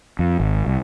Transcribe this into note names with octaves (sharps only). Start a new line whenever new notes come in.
F2
G#1
C2